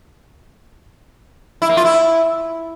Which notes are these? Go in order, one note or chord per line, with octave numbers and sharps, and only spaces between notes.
E4
A#3
F4
E4